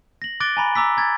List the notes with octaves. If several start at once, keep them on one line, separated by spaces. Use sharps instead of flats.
A#6 F#7
D6 F#6 A6 D7 G7
G#5 A#5 B5
A#5 D6 E6 B6
A#5 G#6 A6